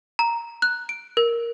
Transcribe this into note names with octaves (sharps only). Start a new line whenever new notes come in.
A#5
F#6
D7
A#4